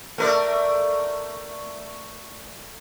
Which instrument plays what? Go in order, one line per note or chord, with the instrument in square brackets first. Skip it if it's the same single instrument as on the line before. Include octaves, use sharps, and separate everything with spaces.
[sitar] A3 A#4 D5